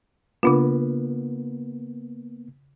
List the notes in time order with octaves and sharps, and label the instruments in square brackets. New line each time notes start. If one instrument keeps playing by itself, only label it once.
[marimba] C#3 D4 F4 [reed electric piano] A#3 B3